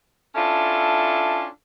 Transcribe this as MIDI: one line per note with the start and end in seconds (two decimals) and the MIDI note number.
0.35 1.46 61
0.35 1.46 62
0.35 1.46 64
0.35 1.46 65
0.35 1.46 69